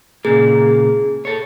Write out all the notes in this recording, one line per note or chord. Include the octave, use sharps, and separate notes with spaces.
A#2 C#3 A#3 G#4
A4 C#5